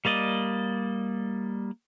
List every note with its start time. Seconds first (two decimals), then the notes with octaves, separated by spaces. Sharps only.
0.05 G3 A#3 D5 D#5